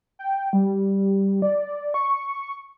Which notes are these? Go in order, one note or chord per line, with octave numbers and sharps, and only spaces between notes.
G5
G3
D5
C#6